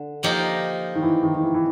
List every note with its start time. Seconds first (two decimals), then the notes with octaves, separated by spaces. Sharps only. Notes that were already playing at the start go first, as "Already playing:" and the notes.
Already playing: D3
0.23 F3 A#3 D#4 G4
0.96 D#3
1.02 E3
1.23 D#3
1.35 D#3
1.43 E3
1.54 E3